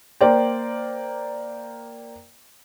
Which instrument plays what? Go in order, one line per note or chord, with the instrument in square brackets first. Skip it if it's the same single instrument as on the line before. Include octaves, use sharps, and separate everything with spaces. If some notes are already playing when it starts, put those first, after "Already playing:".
[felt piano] A#3 C5 D5 G5